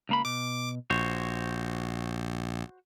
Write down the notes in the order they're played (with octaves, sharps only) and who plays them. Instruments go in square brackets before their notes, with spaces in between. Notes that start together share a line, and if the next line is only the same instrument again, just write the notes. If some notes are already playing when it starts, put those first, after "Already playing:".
[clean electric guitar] C#2 A#3 B5
[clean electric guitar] B2 [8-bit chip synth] D6
[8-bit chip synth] A#1 [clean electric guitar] F#4 C5 C#5